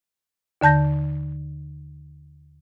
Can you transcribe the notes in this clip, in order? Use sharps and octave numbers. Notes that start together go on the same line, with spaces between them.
D#2 D3 A5 G6 A#6